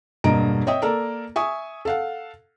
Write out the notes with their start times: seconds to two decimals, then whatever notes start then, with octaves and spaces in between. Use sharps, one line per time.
0.24 E1 G2 A#3 D#5 A#5 D7
0.67 C#5 D#5 E5 G5 D#6
0.82 A#3 A4 A#4 D5
1.36 E5 G#5 C#6 D#6
1.85 A4 F5 F#5